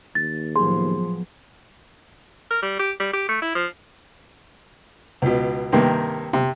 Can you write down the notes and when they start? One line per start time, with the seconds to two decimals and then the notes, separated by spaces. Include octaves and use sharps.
0.15 D#2 A6
0.56 A2 F3 F#3 B3 G#4 C6
2.51 A#4
2.62 G3
2.79 G4
3.00 G3
3.14 G4
3.29 A3
3.42 E4
3.55 F3
5.22 C#2 B2
5.72 G2 C3 D#3 A#3
6.33 C3